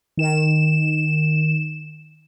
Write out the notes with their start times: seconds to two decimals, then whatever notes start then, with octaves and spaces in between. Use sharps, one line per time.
0.17 D#3 E7